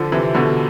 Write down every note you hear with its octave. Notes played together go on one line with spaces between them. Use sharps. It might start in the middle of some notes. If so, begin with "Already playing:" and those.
Already playing: D3 F3
C3 E3
B2 D3